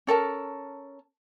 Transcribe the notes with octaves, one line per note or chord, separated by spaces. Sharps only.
C#4 A4 A#4 A5